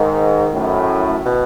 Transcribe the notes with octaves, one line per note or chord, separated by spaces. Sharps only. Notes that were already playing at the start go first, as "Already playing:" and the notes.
Already playing: G#2 D#3
F#2 A2
B2